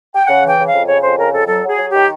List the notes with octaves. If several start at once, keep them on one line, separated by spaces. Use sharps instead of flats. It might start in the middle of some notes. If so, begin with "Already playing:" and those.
G5
C#3 F#5
E3
G5
C#3
F5
F2
C#3 C#5
F2 C5
C#3 A#4
F2 A4
F#3 A4
F#3 G#4
F#3
D#3 G4